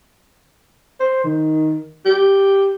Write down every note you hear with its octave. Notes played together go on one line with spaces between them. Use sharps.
C5
D#3
G4